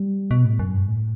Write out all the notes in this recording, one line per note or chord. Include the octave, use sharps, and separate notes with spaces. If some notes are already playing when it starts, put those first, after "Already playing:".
Already playing: G3
B2
A2
F#2
G2
A2